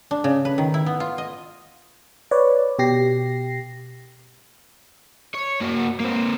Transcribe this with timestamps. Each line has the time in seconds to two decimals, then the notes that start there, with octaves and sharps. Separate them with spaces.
0.11 D4
0.24 C#3
0.45 B4
0.58 D#3
0.74 E4
0.86 B3
1.00 F4
1.18 D#5
2.31 B4 C#5 D5
2.79 B2 G4 A#6 C7
5.35 C#5
5.61 A#3 F#4
6.00 A#3 C4